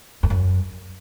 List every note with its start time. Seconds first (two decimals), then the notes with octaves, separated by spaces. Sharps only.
0.23 F2
0.30 F#2